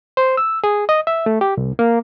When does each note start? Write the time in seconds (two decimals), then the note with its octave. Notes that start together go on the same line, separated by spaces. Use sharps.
0.17 C5
0.37 E6
0.64 G#4
0.89 D#5
1.07 E5
1.26 A3
1.41 G4
1.57 C2
1.79 A#3